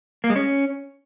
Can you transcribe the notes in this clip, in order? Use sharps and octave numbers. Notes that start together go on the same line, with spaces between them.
A#3
G#3
C#4